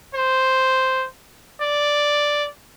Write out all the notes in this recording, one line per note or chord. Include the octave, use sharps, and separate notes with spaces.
C5
D5